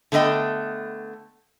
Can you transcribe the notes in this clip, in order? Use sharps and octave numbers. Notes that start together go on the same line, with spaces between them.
D3 A3 B3 D#5 G5